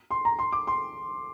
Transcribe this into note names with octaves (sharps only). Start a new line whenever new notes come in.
C6
A#5
C6
D6
C6